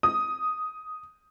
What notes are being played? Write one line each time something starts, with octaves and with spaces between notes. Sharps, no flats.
D#6